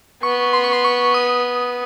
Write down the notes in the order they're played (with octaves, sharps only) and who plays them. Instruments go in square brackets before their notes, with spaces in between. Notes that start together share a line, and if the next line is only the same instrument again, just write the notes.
[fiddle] B3 [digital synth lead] C#6
[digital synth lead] C6
C#6
C6
C#6
D#6